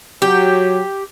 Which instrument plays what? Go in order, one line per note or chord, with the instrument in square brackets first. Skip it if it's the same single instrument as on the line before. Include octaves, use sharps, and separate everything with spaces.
[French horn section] F#3 [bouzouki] G4